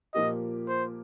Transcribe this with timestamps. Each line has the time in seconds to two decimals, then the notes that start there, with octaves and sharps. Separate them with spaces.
0.14 A#2 F3 A#3 G4 D#5
0.68 C5